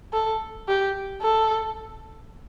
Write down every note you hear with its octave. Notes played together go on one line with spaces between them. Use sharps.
A4
G4
A4